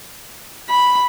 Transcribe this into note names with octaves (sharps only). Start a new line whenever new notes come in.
B5